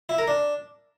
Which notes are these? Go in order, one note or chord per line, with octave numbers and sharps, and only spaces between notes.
E4
A#4
D4